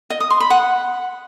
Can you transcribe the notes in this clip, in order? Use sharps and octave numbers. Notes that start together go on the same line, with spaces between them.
D#5
D#6
C6
B5
F#5